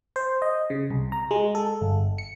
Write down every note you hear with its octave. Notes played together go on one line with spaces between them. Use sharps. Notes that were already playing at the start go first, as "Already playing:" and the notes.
C5
D#5
C#3
C2
A#5
G#3
A4
G1
C#7